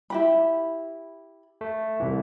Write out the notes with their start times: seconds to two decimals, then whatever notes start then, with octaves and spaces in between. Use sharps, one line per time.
0.10 E4 G4 B5
1.61 A3
2.00 C2 E3